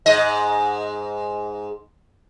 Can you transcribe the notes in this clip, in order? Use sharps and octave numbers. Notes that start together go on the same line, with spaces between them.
G#2 D#5